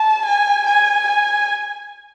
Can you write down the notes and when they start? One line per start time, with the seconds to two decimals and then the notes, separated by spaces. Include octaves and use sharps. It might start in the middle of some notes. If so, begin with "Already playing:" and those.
Already playing: A5
0.25 G#5
0.67 G#5
1.08 G#5